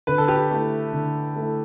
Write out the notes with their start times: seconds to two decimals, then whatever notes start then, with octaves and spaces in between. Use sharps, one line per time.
0.07 D3 B4
0.18 A4
0.28 G4 B4
0.51 A3 E4 A4
0.93 D3
1.36 A3 E4 A4